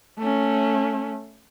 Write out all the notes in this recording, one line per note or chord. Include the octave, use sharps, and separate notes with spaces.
A3 C#4